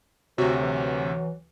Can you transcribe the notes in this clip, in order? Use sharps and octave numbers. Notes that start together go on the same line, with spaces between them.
D2 C3 F#3 F#4
E3